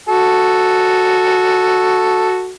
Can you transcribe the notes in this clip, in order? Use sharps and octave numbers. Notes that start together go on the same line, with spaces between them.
F#4 A4